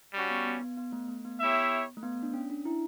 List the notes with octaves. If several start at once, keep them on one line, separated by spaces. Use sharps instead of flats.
G3 C#4 F#4
B3
B3
B3
B3
A3
A3
B3
E4 G4 C#5 E5
A3
B3
D4
C#4
D4
E4